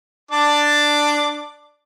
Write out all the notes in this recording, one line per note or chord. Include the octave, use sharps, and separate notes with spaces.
D4 A5 D6